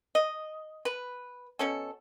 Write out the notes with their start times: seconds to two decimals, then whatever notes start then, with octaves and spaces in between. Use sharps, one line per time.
0.15 D#5
0.85 B4
1.59 B2 C#4 A4